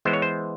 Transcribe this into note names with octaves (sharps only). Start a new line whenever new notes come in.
E3 G#3 B3 C5
C#5
C5